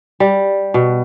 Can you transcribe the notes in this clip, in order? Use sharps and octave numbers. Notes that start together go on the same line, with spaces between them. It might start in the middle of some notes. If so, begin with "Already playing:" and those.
G3
B2